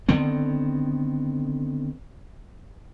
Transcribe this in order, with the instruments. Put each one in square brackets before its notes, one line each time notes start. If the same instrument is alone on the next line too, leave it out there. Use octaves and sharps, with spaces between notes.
[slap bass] D3 D#3 B3 C4